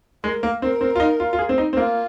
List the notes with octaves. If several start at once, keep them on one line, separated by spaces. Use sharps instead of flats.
G#3 A#4
A#3
C4 A#4
C4
F4
D#4
F4
F4
G#4
C4
D#4
C4
A#3 F4